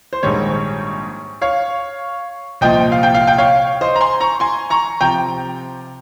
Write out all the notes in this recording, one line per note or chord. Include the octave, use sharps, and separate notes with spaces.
C5
A#1 G#2 D#3 G3 C#5
C#5 F5
C2 A#2 F3 D#5 G5
F5
G5
F5
G5
C#5 F5
C5 D#5
A#5
G#5 C6
A#5 C#6
G#5 C6
A#5 C#6
C3 F3 G5 A#5